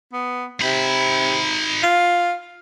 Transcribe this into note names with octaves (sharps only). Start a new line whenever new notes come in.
B3
C3 D#4 B5
F4